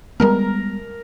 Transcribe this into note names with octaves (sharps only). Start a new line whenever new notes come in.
G3 G#3 B3 A#4 A#5